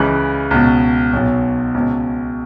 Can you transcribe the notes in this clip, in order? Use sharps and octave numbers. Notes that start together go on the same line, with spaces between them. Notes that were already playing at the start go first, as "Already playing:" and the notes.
Already playing: C#2 C#3 E3 F#6
C#2 B2
B1 B2
C#2 B2